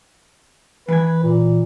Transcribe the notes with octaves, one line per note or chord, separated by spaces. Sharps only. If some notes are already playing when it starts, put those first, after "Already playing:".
E3 B4 G#5
A#2